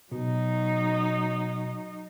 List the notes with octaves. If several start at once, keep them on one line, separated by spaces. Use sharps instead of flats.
B2 F#3 D#4